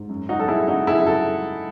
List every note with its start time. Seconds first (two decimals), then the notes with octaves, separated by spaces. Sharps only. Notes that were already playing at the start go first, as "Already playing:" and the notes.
Already playing: G#2
0.09 F#2
0.29 D#4 F#4
0.39 F#3 A4
0.48 E4 G#4
0.68 C#3 D#4 F#4
0.87 E4 G#4
0.97 F#2
1.06 F#4 A4